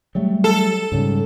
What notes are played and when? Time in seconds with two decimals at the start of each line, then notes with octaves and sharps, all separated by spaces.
0.15 F#3 G3 A3
0.44 A4
0.92 G#2 C#3 G3